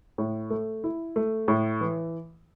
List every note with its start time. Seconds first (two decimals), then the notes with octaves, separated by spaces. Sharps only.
0.18 A2
0.50 A3
0.84 E4
1.16 A3
1.48 A2
1.81 E3